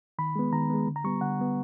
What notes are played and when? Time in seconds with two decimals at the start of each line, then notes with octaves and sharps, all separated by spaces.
0.19 D#3 B5
0.36 G#3 B3
0.53 D#3 A#5
0.70 G#3 B3
0.87 D3
0.96 A#5
1.04 G3 B3 C#6
1.21 D3 F#5
1.39 G3 B3